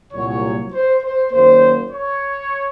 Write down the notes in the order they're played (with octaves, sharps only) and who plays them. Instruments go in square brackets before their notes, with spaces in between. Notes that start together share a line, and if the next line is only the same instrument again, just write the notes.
[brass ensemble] C2 A#2 F#3 C#5
C5
C5
F#2 D#3 F#3 A#3 C5
C#5